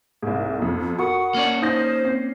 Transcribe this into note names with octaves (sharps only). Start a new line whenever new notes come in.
C2 G#2
B1 F2
F#4 A#4 F#5 B5 C#6 D#6
A#3 C#4 D5
D#4 C5 D#6 G6 A#6
C4 C7